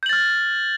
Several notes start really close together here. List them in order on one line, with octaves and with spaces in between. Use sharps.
G6 F#7 A6 F6